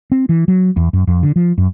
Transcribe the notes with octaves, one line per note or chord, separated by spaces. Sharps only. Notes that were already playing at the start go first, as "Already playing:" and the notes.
C4
E3
F#3
E2
F#2
F2
D3
F3
F#2